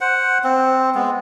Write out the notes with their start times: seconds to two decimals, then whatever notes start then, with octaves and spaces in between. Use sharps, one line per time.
0.01 C5 F#5
0.44 C4
0.95 G#3 B3